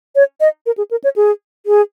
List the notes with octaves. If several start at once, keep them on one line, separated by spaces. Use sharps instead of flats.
C#5
D#5
A#4
G#4
A#4
C#5
G#4
G#4